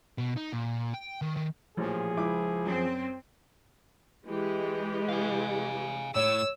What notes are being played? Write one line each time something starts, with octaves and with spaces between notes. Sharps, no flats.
B2
D#4
A#2
G5
D#3
D#3
A1 A#2 F3 G#4
C#2 E4 D6
F#2 C4
E3 G#3 G4
F5 G#5
A2 C#5 E6